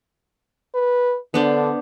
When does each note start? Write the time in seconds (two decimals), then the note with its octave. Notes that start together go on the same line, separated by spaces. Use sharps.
0.75 B4
1.34 D3 B3 D4 C5